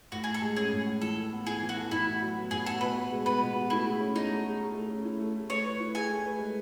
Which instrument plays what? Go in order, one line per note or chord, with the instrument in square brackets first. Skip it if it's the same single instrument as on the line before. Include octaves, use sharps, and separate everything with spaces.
[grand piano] A2 [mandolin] F#4
[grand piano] A2 [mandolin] G#4
[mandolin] A4
[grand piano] G#3
[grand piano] C#4 [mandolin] G#4
[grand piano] A2
A2
[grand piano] E3 [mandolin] A4
[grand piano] A4
B3
[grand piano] E4 [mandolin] G#4
[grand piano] E3
[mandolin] F#4
[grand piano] A4
[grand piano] A2 [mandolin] E4
[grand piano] F#4
F#3
B3
[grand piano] A2 [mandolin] G#4
[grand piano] F#4 [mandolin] A4
[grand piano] B2 [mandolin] B4
[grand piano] F#4
G#3
[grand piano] B3 [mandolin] B4
[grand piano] B2
F#4
[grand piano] A3 [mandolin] E4
[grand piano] G#4
C#4
[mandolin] D#4 [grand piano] E4
[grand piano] A3
G#4
A3
A3
C#4
E4
A3
A3
[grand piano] A3 [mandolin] C#5
[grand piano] B4
E4
[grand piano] G#4 [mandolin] G#5
[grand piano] A3
B4
G#3